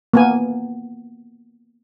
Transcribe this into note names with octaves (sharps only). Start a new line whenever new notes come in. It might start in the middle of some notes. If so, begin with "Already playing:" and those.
A#3 B3 G#5